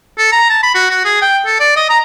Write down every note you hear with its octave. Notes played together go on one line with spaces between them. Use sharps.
A4
A#5
A5
B5
F#4
F#4
G#4
G5
A4
D5
D#5
A#5